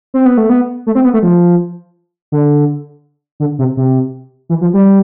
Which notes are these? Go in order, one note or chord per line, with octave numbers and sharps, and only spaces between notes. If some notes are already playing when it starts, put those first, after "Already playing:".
C4
B3
A3
B3
A3
C4
B3
A3
F3
D3
D3
C3
C3
E3
F3
G3